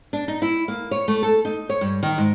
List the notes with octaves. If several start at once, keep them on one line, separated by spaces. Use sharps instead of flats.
D4
D#4
E4
A#3
C#5
A3
A4
D#4
C#5
G2
D#3
G#2